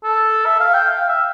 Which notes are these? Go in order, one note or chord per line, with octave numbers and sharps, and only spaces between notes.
A4
E5
F5
G5
F5
E5